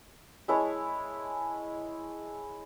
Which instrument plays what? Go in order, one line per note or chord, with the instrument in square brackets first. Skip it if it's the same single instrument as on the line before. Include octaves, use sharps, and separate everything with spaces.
[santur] G#3 E4 C#5 A5